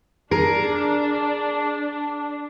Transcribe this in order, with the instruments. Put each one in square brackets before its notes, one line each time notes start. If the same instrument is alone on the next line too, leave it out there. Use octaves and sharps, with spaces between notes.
[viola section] D4 [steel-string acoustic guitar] G#4 A#4